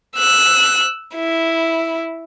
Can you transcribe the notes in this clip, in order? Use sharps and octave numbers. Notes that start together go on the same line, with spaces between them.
E6 F#6
E4